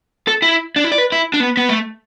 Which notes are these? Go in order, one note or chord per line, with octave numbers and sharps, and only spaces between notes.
A4
E4
D4
E4
D5
B4
E4
D4
B3
B3
A3